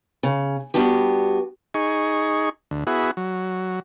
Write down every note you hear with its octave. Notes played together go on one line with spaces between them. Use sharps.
C#3
G3 B3 D4 F#4 G4
D#4 G#4 C#6
D2
B3 E4 F#4 G#4
F#3